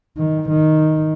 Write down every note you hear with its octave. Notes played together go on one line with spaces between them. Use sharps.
D#3
D#3